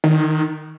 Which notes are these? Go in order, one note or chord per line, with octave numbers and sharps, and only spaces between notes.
D#3